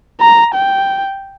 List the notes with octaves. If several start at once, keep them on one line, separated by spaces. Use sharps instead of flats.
A#5
G5